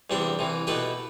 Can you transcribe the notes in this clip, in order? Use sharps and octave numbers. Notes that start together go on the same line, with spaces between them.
E2 C3 G3 D4 G4
C2 C3 E3
B2 A3 E4 G4 B4